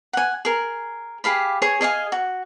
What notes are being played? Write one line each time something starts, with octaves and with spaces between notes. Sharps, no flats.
F#5 G#5
G#4 A#4
G4 G#4 F5 B5
G#4 C#5 G#5
G#4 D#5 F5 G#5
F#4